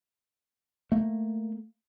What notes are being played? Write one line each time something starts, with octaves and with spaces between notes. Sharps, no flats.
A3 A#3